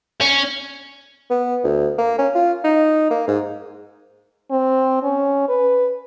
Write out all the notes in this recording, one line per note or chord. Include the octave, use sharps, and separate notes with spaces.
C#4
B3
D2
A#3
C#4
F4
D#4
A#3
G#2
C4
C#4
B4